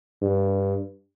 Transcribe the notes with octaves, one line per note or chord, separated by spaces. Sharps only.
G2